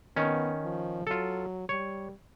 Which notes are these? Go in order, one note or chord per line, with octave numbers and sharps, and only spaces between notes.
D#3 B3 C#4
F3
F#3 F4 A4
G3 C#5